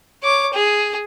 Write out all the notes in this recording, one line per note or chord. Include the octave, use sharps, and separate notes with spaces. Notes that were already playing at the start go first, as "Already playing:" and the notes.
C#5 D6
G#4